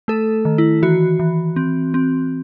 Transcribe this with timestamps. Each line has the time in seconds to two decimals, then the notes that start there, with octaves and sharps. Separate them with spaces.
0.08 A3 A4
0.45 D#3
0.58 E4
0.82 E3 F#4
1.19 E3
1.56 C4
1.94 C4